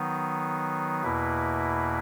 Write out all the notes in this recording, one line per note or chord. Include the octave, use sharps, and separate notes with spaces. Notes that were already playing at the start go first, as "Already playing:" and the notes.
Already playing: D#3 F#3 B3 D#4
E2 B2 A#3 E4 B4